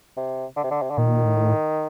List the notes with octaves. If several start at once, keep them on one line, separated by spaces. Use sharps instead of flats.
C3
D3
C3
D3
C3
D3
A#2 D#3
A2